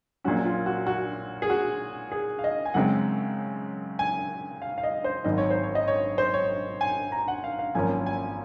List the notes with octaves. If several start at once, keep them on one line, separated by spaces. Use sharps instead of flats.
A#1 A#2 F#3 C#4 F#4
F4
F#4
F#4
G#4
F#4
G#4
F5
D#5
G#5
F#2 C#3 G#3 C4 F#5
G#5
F5
F5
D#5
C5
G#1 F#2 D#3 D#5
C#5
C5
C#5
D#5
C#5
C5
C#5
G#5
A#5
F#5
F5
F5
G#1 F#2 F3 A#3 C#4 G#5
G#5